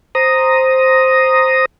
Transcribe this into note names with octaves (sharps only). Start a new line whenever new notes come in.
C5 A#5 D#6